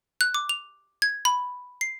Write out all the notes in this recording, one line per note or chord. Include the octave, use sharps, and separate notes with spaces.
F#6
D6
F7
G#6
B5
C7